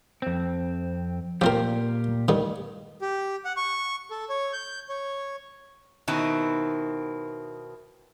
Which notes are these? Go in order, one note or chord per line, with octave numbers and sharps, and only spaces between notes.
F2 C4
A#2 F3 C4 F4 G4 A#4
G2 D#3
G4
F#5
C#6
A4
C#5
G6
C#5
B2 D#3 C4 E4